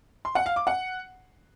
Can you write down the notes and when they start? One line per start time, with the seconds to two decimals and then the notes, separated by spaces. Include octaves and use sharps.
0.25 C6
0.35 F#5
0.46 F5
0.56 D6
0.67 F#5